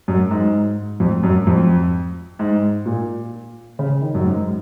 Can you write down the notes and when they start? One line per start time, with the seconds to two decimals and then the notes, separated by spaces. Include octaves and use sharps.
0.08 F#2
0.31 G#2
1.00 F2
1.23 F#2
1.47 F2
2.39 G#2
2.86 A#2
3.79 C#3
4.01 D#3
4.15 F#2
4.25 G#2